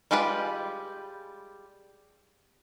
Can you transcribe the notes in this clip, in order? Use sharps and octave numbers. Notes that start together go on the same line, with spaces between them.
G3 G#3 F4 G4 B4